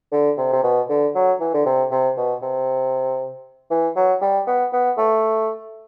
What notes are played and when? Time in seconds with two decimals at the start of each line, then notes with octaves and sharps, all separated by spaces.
0.12 D3
0.38 C3
0.53 C3
0.63 B2
0.89 D3
1.15 F#3
1.40 E3
1.54 D3
1.66 C3
1.91 C3
2.17 B2
2.42 C3
3.71 E3
3.96 F#3
4.22 G3
4.47 B3
4.73 B3
4.98 A3